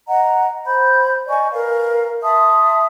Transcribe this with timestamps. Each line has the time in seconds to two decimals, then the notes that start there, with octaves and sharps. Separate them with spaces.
0.08 D#5 F#5 A#5
0.65 C5 B5 G6
1.28 D5 D#5 G#5 C#6
1.52 A#4 B4 F5
2.22 E5 A5 C6 D#6